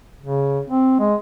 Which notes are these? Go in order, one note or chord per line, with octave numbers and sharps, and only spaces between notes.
C#3
C4
G#3